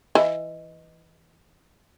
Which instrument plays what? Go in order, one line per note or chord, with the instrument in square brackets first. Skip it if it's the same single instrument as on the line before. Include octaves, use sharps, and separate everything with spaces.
[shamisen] E3 [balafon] D#5